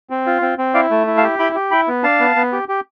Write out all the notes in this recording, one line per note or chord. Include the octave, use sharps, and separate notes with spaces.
C4
F4
C4
C4
E4 D5 F5
A3
E4
F5 A5
G4
E4 G5 B5
G4
E4 G5 B5
B3
D4 F5 A5
B3
B3
G4
G4